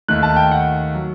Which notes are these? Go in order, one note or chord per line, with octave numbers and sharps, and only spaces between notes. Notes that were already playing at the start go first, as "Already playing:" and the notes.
D#2 D#3 A3 F#6
A5
G5
F#5
F#3